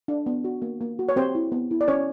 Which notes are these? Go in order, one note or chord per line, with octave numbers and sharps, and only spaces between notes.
D4
B3
F#4
A#3
A#3
F#4
C#5
C4 G4 C5
E4
B3
E4
D5
C#4 C#5